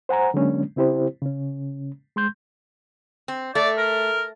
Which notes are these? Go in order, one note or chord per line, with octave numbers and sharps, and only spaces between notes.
C5 F#5 G#5 A#5
D3 F#3 G#3 A#3 C#4 D4
C#3 C4 E4 G4 C5
C#3 C#4
G#3 C6 G6
C4
A3 D5
A#4